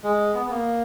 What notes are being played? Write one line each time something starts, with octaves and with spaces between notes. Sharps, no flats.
G#3
B3
B3
A#3